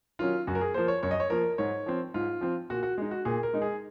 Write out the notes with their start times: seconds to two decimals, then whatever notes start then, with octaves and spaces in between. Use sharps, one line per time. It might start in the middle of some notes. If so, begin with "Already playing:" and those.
0.19 D#3 F#3 C#4 F4
0.47 F#2 F#4
0.55 A#4
0.61 G#4
0.74 F3 A#3 C5
0.88 C#5
1.03 F#2 C#5
1.11 D#5
1.20 C#5
1.30 F3 A#3 A#4
1.58 G#2 C#5
1.86 F3 C4
2.14 G#2 F4
2.41 F3 C4
2.70 A#2 F#4
2.83 F#4
2.98 G#3 D#4
3.11 F#4
3.25 A#2 G#4
3.43 A#4
3.54 G#3 D#4
3.62 G#4